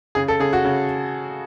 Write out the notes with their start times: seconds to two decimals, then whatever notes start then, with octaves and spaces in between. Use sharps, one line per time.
0.15 C#3 G#4
0.28 A4
0.39 C#3 G#4
0.53 F#4
0.65 C#3